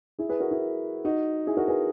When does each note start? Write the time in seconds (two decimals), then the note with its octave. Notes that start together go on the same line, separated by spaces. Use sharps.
0.19 E4 G#4
0.29 G#4 B4
0.40 F#4 A#4
0.51 E4 G#4
1.04 D#4 F#4
1.47 E4 G#4
1.57 F#4 A#4
1.68 G#4 B4